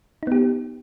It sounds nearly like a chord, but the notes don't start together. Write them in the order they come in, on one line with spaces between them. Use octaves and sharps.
D#4 B3 G4